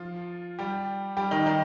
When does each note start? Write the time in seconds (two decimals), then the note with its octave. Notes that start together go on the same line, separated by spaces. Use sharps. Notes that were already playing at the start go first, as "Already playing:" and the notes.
Already playing: F3 F4
0.59 G3 G4
1.17 G3 G4
1.31 D#3 D#4
1.46 D#3 D#4